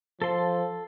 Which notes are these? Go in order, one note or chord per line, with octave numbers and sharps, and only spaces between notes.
F3 A4 C6